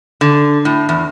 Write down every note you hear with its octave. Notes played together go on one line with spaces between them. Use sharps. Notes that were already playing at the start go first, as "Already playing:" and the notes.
D3
A2
E2